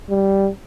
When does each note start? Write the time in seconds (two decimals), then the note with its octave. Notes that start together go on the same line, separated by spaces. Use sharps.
0.10 G3